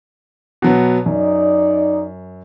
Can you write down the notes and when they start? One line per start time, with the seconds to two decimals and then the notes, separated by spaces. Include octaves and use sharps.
0.62 B2 F#3 B3
1.06 F#2 D#4 D5